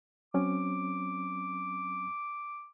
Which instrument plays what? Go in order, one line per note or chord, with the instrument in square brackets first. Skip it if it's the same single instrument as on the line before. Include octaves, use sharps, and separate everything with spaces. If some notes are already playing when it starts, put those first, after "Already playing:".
[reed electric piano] F#3 C4 C#4 [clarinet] D6